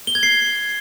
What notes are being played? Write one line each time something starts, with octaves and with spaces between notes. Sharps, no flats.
G7
G#6
C7